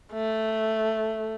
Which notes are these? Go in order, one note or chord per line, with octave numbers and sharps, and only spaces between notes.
A3